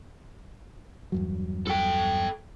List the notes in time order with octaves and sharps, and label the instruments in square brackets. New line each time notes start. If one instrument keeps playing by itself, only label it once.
[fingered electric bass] E2 G2 F#3
[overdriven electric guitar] A4 G5